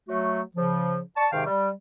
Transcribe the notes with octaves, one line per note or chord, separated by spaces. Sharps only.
F#3 A3 F#4
C#3 F3
D5 A5 C#6
G#2 C3 D#3 F5 G5
G3